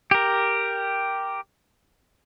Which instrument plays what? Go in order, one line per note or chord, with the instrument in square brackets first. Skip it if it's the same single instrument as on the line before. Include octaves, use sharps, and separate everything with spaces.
[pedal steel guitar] G4 A#4